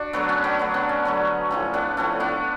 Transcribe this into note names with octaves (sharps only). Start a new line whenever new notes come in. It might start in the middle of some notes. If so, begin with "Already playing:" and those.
Already playing: D4 F#4
D3 F#3 A3 B3
C#4
B3 D4
D3 F#3 A3
B3 D4
C#4
D3 F#3 A3 C#4
A2 F3 A3 C#4
B3 D4
A2 F3 A3 C#4
B3 D4